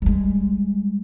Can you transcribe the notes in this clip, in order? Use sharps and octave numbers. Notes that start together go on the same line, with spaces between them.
G3 G#3